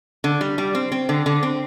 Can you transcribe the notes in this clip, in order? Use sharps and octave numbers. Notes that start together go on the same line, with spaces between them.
D3
G3
G3
C4
C4
D3
D3
C4